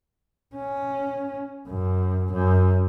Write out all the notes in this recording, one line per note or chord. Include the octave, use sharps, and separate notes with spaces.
C#4
F#2
F#2